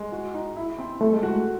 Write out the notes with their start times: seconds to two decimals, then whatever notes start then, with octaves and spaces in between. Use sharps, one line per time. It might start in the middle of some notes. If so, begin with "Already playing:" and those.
Already playing: G#3
0.12 F#4
0.34 D#4
0.56 E4
0.78 C4
1.01 A3 A4
1.13 G#3
1.23 A3 F#4